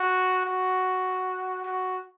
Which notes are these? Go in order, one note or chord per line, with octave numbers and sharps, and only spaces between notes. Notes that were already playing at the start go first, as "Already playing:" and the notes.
Already playing: F#4
F#4
F#4